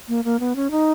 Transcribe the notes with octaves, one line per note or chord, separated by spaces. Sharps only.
A#3
A#3
B3
C#4
D#4